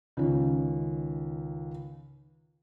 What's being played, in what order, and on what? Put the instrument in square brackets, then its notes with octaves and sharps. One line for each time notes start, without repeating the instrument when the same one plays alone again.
[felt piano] C#2 D#3 C#4